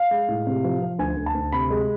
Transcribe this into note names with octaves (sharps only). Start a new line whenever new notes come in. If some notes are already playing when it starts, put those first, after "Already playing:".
Already playing: F5
G#3
A2
C3
F3
F3
D2 G#5
D2
A5
D2
C3 B5
G#3